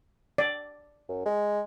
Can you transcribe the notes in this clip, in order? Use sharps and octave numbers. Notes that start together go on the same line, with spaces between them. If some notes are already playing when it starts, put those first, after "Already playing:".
D5
F#2
G#3